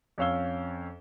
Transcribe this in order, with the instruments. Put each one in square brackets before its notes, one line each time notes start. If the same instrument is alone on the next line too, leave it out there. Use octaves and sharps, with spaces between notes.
[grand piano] F2 C#4 C#5 F5 E6 G7